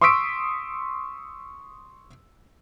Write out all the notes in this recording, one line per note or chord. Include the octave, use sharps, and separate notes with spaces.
C6 C#6 D#6 E6 B6 D7